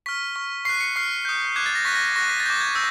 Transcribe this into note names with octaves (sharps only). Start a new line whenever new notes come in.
C#6 F6 B6
C#6 F6
C#6 F#6 C7
C#7
C#6 F6 C7
D#6 G6
D6 F#6 G#6
A6
A#6
C#6 F#6 B6
A#6
A#6
C#6 F#6 A#6
B6
A6
D6 G6 A#6
G#6
E6 G6